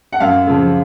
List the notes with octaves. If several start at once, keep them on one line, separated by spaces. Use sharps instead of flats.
F#5
F#2 F5
C#3 F3